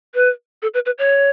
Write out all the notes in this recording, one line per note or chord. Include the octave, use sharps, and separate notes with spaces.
B4
A4
B4
B4
C#5